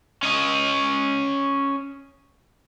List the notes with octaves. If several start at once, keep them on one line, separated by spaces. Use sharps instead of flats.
C#4 D#5